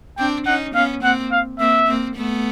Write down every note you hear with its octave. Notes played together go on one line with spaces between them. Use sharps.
C4 D4 G5
C#4 D#4 F#5
B3 C#4 F5
A#3 C4 F#5
F5
A#3 C4 E5
A#3 C4
A3 B3